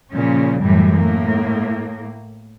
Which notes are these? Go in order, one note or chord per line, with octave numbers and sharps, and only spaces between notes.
A#2 C#3 F3 C#4
F#2 A2 E3 G3
A2 A#3